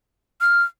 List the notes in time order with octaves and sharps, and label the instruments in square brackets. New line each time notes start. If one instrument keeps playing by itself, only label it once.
[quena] F6